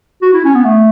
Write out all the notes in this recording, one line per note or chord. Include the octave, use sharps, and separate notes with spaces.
F#4
E4
C#4
B3
A3